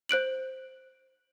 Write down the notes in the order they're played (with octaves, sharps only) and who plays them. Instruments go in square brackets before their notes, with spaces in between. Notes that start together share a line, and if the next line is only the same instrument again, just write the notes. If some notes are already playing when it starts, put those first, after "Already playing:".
[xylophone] C5 F#6 D7 F#7